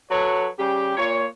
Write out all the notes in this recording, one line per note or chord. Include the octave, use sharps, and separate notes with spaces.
F#3 A4 B4 C#5
C#3 G3 G4
A#2 C#5